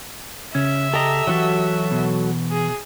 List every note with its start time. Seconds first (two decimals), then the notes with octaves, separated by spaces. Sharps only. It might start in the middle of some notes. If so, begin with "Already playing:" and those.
0.55 C#3 C#4 E5
0.94 G4 A4 D#5 A#5
1.27 E3 F#3 F#4 A4
1.91 B2
2.51 G#4